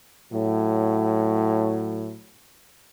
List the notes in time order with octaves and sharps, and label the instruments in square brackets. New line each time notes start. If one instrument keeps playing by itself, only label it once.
[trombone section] A2 F#3